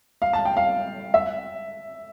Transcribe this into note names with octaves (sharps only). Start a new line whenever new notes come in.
F5
A5
G5
F5
E5